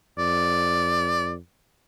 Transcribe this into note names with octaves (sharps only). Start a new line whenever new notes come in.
F2 D5